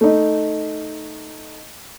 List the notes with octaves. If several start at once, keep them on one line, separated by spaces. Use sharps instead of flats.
A3 D#4